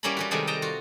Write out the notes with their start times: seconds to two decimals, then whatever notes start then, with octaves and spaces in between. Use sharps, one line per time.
0.03 G3 A#3 C#4 E4 A#5 B5
0.17 G3 C#4 F#4
0.31 C3 D#3 G3 G#3 B3 A4
0.47 D#5 G5 A5 A#5
0.62 F4 F#4